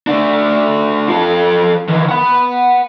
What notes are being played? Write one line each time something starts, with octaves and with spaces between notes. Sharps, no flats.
A3 D4
F3 A4
D#3 E3
F#5 B5